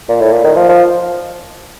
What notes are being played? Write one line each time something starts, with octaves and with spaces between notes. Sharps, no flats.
A#2
A2
A#2
D#3
F3
F3